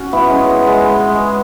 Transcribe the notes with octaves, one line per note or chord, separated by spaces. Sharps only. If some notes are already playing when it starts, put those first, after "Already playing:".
Already playing: C#4 F#4
B3 E4
G#3 C#4
B3
G#3
B3
G#3